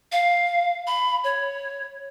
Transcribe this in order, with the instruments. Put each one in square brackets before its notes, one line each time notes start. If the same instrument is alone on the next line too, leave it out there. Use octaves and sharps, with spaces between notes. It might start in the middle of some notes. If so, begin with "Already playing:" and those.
[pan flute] F5
B5
C#5